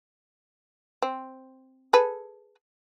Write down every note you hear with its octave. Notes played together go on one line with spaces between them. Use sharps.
C4
G#4 A4 B4